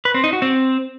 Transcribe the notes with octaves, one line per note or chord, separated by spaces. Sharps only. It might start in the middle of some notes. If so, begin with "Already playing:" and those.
B4
C4
D#4
F#4
C4